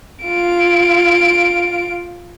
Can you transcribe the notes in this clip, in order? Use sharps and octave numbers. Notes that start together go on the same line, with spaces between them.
F4 D7